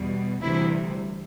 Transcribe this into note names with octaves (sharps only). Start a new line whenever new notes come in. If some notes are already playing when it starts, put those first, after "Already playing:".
Already playing: E2 B2 G3
D2 C3 E3 G3 E4